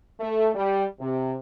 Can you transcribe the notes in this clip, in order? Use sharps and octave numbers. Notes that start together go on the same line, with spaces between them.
A3
G3
C3